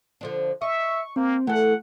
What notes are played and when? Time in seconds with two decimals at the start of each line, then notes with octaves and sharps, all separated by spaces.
0.21 D3 F3 D4
0.62 D#5 E5 C#6
1.16 A#3 C4
1.47 E3 A3 A4 F#5